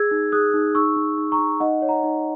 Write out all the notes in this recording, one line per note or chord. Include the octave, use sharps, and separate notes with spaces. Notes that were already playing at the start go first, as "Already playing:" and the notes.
Already playing: G#4 E6 G#6
D#4
G#4 D#6 F#6
D#4
D#4 C#6 E6
D#4
D#4
A#5 C#6
D#4
D#4 D#5 F#5
C#5
F#5 A#5
D#4